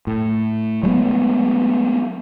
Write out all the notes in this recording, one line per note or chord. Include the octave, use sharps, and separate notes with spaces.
A2
F#3 G#3 A3 B3